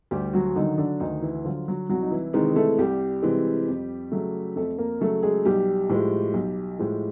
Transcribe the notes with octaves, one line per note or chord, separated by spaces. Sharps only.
D2 G3 G4
F#3 F#4
D3 D#3 F#3 D#4
D3 D4
D2 D#3 D#4
E3 E4
D3 F3 F#3 F4
F#3 F#4
C2 F#3 F#4
D#4
E3 E4
C3 D#3 E3 G#3 D#4
A3 A4
C2 G3 G4
C3 E3 G#3
F2
C#3 F#3 A3
F2 A3 A4
A#3 A#4
C#3 F#3 A3 A4
G#3 G#4
B1 G3 G4
A2 F3 G#3
B1
A2 F3 G#3